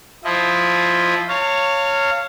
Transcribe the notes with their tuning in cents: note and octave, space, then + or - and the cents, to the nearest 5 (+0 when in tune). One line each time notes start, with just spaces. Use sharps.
F3 +0 E4 +0 D#5 +0
C#5 +0 F5 -5 A5 +45